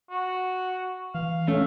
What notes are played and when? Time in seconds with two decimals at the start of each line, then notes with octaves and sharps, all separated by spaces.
0.10 F#4
1.14 E3 F5
1.48 A3 C#4